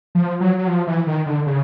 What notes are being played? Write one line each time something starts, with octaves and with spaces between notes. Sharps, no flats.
F3
F#3
F#3
F3
E3
D#3
D3
C#3